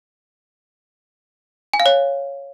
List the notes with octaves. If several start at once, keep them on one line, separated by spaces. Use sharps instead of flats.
G#5
F5
C#5